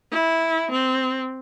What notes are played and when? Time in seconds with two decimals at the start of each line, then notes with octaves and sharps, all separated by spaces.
0.12 E4
0.71 C4